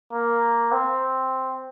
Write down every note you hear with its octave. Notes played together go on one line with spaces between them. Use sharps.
A#3
C4